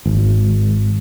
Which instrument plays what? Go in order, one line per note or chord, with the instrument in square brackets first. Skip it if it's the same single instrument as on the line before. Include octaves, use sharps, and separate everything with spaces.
[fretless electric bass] G#1